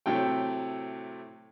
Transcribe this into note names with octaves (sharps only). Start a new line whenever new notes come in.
A2 C3 F#3 A3 G5